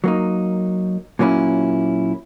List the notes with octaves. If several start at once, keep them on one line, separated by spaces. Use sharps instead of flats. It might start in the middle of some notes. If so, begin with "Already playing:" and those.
F#3 A#3 D#4
A#2 F#3 A#3 C#4 E4